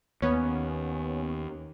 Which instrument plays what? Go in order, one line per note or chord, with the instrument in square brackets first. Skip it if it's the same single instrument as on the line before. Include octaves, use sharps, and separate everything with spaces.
[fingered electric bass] D#2 [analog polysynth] B3 C#4